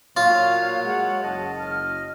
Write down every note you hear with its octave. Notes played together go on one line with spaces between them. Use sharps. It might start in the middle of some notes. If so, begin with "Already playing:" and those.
A#2 F#3 F4 C#5 F5
G#3 F#5
F#1 D#5 A5
F6